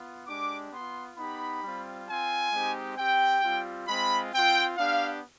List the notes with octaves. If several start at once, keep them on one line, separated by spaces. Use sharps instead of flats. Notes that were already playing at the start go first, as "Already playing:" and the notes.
Already playing: B3 F4
G#3 D4 G4 D6
B3 F4 C6
B3 D#4 G4 B5
G3 C4 F4
C4 F4 G#5
G#3 C4 D#4 G4
C4 G4 G5
G3 C4 F4
G#3 C4 F4 B5
C4 F4 G5
B3 D4 G4 F5